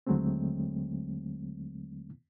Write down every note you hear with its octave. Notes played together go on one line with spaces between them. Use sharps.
D#2 D3 F#3 G#3 A3 C4